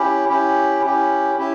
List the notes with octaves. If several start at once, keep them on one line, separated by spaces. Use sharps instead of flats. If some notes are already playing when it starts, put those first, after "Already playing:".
Already playing: C#4 E4 G4
C#4 E4 G4
C#4 E4 G4
C#4 E4 G4